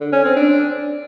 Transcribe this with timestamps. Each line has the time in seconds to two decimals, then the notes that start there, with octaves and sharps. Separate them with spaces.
0.01 D3
0.12 C#4
0.24 C4
0.36 D4